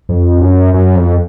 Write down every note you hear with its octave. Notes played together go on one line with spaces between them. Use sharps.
F2
F#2
F#2
F2